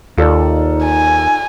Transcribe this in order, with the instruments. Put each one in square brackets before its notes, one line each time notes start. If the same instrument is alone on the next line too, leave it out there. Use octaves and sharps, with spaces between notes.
[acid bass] D#2 [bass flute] D#4 [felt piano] F4 A4 D5
[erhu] G#5